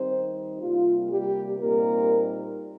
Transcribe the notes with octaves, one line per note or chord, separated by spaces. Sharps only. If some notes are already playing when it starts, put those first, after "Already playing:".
Already playing: D#3 G3 C4 D#4 C5
C3 G3 A#3 F4
G3 G4
A#2 G3 A#3 C4 D#4 A#4